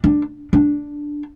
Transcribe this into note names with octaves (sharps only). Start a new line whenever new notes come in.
D4
D4